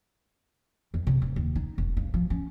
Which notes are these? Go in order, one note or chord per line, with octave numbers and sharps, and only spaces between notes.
E2
C3
D1
D#2
D#4
E1
G2
F3
C#4